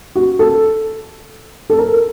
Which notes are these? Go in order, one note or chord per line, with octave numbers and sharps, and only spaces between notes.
F#4
A4
A4
A#4